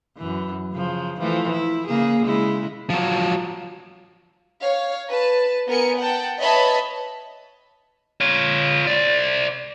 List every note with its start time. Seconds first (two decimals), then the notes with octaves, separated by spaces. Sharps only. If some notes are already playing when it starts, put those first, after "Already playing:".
0.17 F#2 E3
0.73 C#3 F3
1.19 E3 F3 A3
1.52 E4
1.87 C#3 A#3 G#4
2.25 C#3 G#3 E4
2.90 F3 F#3
4.64 C#5 F5
5.10 B4 A5
5.68 B3 A#4 G#5 C#7
5.98 F#5 G5 A5
6.40 B4 C#5 D#5 E5 A5 B5
8.21 F4 C#5
8.87 C5 D5